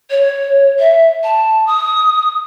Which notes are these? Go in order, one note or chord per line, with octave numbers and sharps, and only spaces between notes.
C#5
E5
A5
D#6